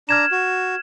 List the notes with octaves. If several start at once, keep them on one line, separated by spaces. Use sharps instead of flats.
D4 A#5 F6 G#6 E7
F#4